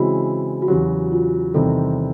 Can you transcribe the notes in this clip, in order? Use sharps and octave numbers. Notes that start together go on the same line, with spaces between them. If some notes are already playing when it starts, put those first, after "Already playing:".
Already playing: C#3 E3 G#3 C4 E4 F#4
F#4
E2 C#3 F#3 G4
F4
E2 C3 D#3 G3 C4 A4